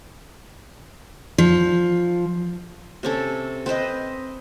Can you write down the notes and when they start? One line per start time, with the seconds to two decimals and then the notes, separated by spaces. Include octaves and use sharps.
1.38 F3
3.03 C3 C#4 A4
3.66 C4 B4 C5 D#5